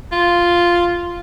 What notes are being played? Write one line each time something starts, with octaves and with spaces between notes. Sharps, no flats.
F4